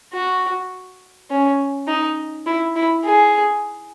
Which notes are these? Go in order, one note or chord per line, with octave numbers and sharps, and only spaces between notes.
F#4
C#4
D#4
E4
E4
G#4